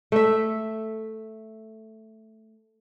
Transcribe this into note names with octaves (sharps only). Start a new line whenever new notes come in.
A3 E5